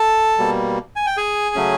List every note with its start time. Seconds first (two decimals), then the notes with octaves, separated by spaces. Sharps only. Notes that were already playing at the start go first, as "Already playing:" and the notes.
Already playing: A4 A5
0.38 B2 G3 A#3
0.96 G#5
1.06 G5
1.17 G#4 G#5
1.55 C#3 F#3 A3 C#4